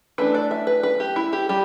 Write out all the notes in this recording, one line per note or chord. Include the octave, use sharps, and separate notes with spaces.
E3 A3 D4 B4
D5
E5
B4
B4
G4
E4
G4
G3 G4